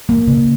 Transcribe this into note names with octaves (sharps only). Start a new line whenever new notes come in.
A#3
C#3